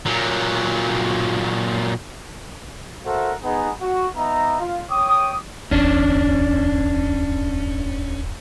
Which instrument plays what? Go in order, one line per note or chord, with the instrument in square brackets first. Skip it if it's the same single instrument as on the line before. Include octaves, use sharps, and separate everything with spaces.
[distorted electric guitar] A#2 F#3
[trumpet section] F#4 A4 A#4 C5 E5 F#5
B3 D#4 G#4
F#4
B3 D#4 E5 A#5
F4
C#5 G5 D6 D#6
[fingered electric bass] D1 G1 E2 [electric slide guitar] C#4 D4